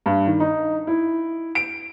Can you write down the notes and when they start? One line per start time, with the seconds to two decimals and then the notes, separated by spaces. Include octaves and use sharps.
0.06 G2
0.27 D#3
0.40 D#4
0.87 E4
1.55 D7